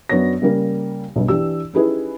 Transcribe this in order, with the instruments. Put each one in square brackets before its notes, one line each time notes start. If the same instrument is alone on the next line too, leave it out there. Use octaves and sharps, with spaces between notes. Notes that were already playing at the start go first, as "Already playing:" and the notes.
[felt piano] F#2 F#3 B3 D4 C#5 A#6
C#3 G3 A#3
B1 G2
E3 D4 G4 E6
C#4 D#4 E4 G4 G#4 B4